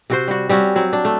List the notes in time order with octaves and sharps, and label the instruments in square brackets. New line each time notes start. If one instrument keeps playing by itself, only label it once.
[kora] C3 F#4 C5
G3 F#4
G3 C4 C#4 F#4
F#3 C4
D4
A3